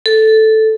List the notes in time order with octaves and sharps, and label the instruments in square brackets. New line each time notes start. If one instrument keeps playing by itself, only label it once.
[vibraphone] A4